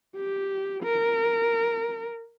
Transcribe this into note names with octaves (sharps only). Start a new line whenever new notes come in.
G4
A#4